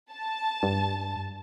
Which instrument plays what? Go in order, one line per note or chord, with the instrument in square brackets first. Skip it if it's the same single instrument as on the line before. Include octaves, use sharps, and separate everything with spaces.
[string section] A5
[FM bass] G2